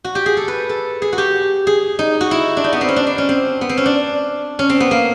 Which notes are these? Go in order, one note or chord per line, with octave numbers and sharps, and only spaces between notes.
F#4
G4
G#4
A4
B4
A4
G#4
F#4
G4
G#4
D#4
F#4
E4
D4
D#4
B3
C4
C#4
D4
D4
C#4
C4
B3
C4
C#4
D4
C#4
C4
B3
A#3